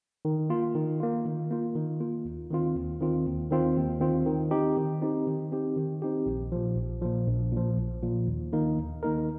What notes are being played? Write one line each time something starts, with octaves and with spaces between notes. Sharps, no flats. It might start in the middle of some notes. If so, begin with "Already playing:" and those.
D#3
A#3 F4
D#3
A#3 F4
D#3
A#3 F4
D#3
A#3 F4
D#2
D#3 C4 F4
D#2
D#3 C4 F4
D#2
D#3 C4 F4
D#2
D#3 C4 F4
D#3
C4 D#4 G4
D#3
C4 D#4 G4
D#3
C4 D#4 G4
D#3
C4 D#4 G4
A#1
A#2 F3
A#1
A#2 F3
A#1
A#2 F3
A#1
A#2 F3
D#2
D#3 A#3 D#4 A#4
D#2
D#3 A#3 D#4 A#4